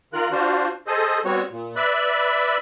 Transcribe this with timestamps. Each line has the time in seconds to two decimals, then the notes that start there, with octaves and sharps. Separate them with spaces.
0.13 D#3 F4 A#4 F#6
0.32 D4 F4 F#4 C5
0.87 G#4 A4 C5 D#5
1.25 G3 B3 C4 F#4 C#5
1.50 A#2
1.76 B4 D5 E5 B5 F#6